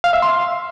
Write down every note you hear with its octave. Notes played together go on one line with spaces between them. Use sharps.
F5
E5
C6